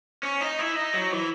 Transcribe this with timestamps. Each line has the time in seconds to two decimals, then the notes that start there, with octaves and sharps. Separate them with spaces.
0.23 C#4
0.41 D#4
0.59 E4
0.76 D#4
0.94 F#3
1.12 E3